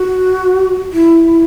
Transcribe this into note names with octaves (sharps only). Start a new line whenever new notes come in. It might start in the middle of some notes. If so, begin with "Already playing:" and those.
Already playing: F#4
E4